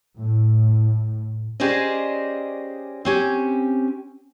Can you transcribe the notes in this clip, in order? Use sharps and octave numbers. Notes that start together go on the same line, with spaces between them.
A2
C#4 G4 G#4 C5 D5 D#5
C4 C#4 G4